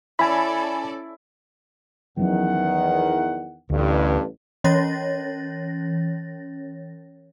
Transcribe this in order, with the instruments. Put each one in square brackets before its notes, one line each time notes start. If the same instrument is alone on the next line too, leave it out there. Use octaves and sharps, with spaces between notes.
[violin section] C#4 A4 D5 [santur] E4 [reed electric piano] G#5 B5
[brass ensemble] E2 D#3 F#5 [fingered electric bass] F3 F#3 C#4
[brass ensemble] A1 G2 [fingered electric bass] D2
[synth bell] E3 C#4 C#5 A6 A#6